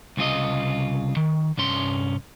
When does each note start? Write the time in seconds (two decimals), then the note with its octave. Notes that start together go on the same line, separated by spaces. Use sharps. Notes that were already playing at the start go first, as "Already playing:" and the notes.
0.17 C2 C#3 F4 D#5
1.17 D#3
1.57 C2 G2 C#4 C6